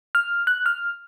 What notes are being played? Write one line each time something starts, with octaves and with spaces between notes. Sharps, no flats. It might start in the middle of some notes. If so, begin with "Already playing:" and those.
F6
F#6
F6